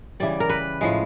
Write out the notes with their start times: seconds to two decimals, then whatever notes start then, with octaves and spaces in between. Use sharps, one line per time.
0.20 C#3 E3 G3 D5
0.40 A#4
0.50 B4
0.81 A2 F3 G#3